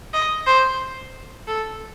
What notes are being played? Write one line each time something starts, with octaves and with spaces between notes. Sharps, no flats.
D#5
C5
A4